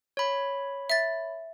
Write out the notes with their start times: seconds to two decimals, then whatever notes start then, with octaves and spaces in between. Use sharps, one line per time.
0.17 C#5 B5
0.90 E5 A6